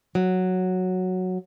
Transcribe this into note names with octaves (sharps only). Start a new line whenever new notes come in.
F#3